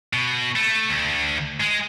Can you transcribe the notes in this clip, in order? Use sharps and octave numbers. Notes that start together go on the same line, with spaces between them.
B2
A3
D2
G#3